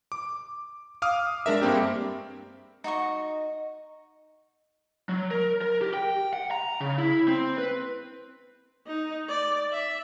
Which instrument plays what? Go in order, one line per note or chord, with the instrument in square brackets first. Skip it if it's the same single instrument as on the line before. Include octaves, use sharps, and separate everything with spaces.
[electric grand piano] D6
F5 D6 D#6 F6
G#3 D4 A#4 E5
G2 A#3 C4 G4
[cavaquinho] D#4 F#4 D#5 C#6
[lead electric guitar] F#3
A#4
A#4
G4
G5
F#5
A#5
C#3
E4
C4
B4
[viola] D#4
D5
E5